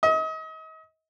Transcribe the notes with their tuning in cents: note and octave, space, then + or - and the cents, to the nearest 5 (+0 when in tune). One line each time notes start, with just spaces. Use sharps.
D#5 +35